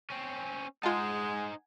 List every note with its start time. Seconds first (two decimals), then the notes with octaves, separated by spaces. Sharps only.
0.10 C4 C#4
0.83 G#3 D#4 F4 C5 F#5 G#5 A5 G#6